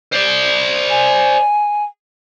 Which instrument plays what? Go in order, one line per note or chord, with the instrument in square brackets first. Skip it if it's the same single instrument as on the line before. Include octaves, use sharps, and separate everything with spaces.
[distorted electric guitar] C5 D5
[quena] G#5